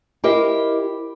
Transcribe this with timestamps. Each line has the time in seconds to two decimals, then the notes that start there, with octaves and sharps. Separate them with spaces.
0.24 E4 G4 A#4 C5 D#5 G5